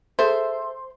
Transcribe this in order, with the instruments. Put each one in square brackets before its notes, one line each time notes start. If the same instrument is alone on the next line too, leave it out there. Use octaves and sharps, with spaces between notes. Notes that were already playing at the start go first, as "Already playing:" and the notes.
[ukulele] G#4 A4 E5 [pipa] C5